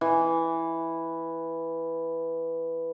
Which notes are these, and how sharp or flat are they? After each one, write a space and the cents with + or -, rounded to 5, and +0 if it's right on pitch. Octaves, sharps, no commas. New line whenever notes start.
E3 +0